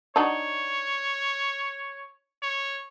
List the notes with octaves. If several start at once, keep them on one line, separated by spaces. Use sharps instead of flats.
D4 D#4 F#4 C#5
C#5